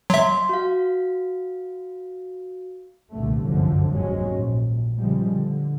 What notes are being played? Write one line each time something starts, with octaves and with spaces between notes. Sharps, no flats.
F#3 E5 C6
F#4 F5
C2 G2 A#2 D3 A3
G1 C2 F#2 D3 F3
F1 D#2 G#2 F#3 G#3 C#4
A#1
C#3 F3 G3 G#3
D3